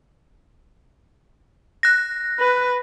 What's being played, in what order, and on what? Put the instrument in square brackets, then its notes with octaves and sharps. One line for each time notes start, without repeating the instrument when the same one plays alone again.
[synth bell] F#6 A#6
[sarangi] B4